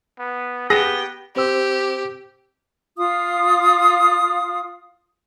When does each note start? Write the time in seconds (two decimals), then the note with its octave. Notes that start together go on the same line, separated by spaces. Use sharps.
0.19 B3
0.70 B3 G4 G#4 G5 D#6 A#6
1.36 C4 G4 C5 E6
2.98 F4 F5 D#6